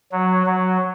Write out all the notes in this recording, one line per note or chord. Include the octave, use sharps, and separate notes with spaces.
F#3
F#3